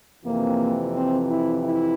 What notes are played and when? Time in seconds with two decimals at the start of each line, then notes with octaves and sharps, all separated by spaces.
0.25 F2 C3 E3 A#3
0.94 C4
1.28 E4
1.63 E4